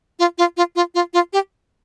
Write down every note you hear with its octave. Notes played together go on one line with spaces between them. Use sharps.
F4
F4
F4
F4
F4
F4
G4